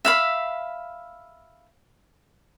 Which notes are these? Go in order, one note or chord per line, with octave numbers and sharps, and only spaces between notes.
E5 F5 B5